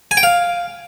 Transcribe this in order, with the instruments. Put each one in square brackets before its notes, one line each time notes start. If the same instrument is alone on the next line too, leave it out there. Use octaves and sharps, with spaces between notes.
[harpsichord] G#5
G5
F5